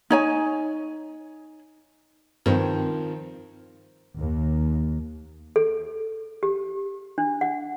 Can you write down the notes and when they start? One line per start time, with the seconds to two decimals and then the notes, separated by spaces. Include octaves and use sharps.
0.10 D#4 C#5 G#5
2.46 G2 D#3 F3 C4
4.17 D#2
5.56 A4
6.43 G4
7.18 D4
7.41 F#5